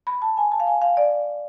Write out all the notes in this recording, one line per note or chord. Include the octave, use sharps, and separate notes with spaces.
B5
A5
G#5
A5
F5
G#5
F5
D5